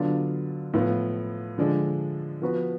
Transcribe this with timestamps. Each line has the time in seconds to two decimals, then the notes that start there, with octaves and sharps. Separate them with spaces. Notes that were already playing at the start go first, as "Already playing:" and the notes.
Already playing: D3 F#3 B3 D4 F4
0.74 A2 F3 B3 F4
1.58 D3 F3 G#3 D4
2.42 F3 B3 F#4 B4